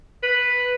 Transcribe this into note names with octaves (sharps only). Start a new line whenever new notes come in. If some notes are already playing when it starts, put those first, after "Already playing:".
B4